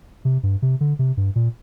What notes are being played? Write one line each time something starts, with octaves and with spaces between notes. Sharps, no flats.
C3
G2
C3
D3
C3
G2
A#2